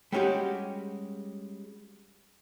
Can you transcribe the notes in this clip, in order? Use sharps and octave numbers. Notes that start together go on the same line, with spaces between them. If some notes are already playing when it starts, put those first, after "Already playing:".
G3 G#3 C#4 F#4 G4